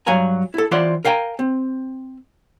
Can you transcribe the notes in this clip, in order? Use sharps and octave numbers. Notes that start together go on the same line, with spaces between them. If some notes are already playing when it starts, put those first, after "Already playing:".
G2 F#3 F5 G#5 A#5
E4 A4
E3 F4 C5 D5 F#5 C6
A#4 F5 G5 G#5 A#5
C4